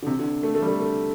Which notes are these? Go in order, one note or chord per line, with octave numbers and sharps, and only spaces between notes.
D3
C3
D3
A3
A3
G3
A3
A3